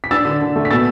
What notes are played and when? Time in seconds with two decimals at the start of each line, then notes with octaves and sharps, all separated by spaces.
0.04 B6
0.11 D4 E6 A6
0.25 D3
0.41 D3
0.56 A3
0.65 B6
0.71 B2 E6 A6